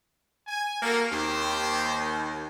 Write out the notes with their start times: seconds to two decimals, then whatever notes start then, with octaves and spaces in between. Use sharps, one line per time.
0.47 G#5
0.82 A#3 F#4 A4 A#4
1.12 D#2 C4 G4 C5